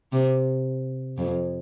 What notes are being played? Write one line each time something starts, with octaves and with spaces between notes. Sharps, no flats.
C3
F2